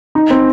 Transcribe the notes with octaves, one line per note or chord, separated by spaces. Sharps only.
D#4
C4